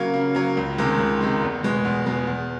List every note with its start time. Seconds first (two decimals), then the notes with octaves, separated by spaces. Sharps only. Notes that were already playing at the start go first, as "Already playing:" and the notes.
Already playing: C#3 F#3 A#3
0.14 C#3
0.35 F#3 A#3
0.57 C#2
0.78 C3 D#3 G#3
0.99 C#2
1.20 C3 D#3 G#3
1.42 E2
1.63 B2 G#3 B3
1.85 E2
2.06 B2 G#3 B3
2.27 E2